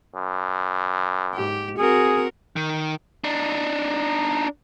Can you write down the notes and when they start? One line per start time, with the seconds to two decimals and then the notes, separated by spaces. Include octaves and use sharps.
0.16 F#2
1.34 G#2 G4
1.78 C4 F#4 G#4 A#4
2.56 D#3
3.24 D4 D#4